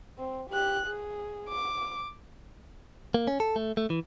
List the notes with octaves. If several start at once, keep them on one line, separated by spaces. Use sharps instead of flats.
C4
G4 F#6
G#4
D6
A#3
C#4
A4
A3
A3
E3